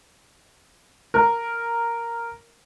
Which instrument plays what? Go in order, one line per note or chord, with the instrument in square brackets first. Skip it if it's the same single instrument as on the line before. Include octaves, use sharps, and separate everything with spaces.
[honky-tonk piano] A#4